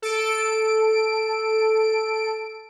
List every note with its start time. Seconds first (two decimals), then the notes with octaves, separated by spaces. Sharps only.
0.02 A4 D7